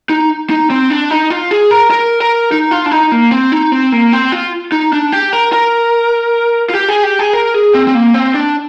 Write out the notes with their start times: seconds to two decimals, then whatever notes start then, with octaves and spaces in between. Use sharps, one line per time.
0.09 D#4
0.50 D#4
0.70 C4
0.90 D4
1.10 D#4
1.30 F4
1.51 G#4
1.71 A#4
1.91 A#4
2.21 A#4
2.52 D#4
2.71 F4
2.86 D4
2.91 D#4
3.12 A#3
3.32 C4
3.52 D#4
3.72 C4
3.92 A#3
4.12 C4
4.32 F4
4.72 D#4
4.93 D4
5.12 G4
5.33 A#4
5.53 A#4
6.70 F4
6.74 G4
6.89 G#4
7.03 G4
7.19 G#4
7.33 A#4
7.54 G#4
7.74 C4
7.87 C4
7.94 A#3
8.14 C4
8.34 D4